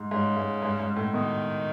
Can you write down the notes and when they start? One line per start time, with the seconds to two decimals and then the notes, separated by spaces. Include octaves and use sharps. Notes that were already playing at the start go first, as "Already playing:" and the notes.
Already playing: G#2
0.11 G#2 C#3
0.37 G#2
0.63 G#2
0.79 G#2
0.96 A2
1.13 B2 D#3